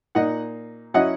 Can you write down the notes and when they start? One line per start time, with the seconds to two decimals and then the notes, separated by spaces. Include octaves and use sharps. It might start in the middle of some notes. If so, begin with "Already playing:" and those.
0.15 A#2 A#3 D#4 D#5 F#5
0.94 F#3 C#4 E4 D#5 F#5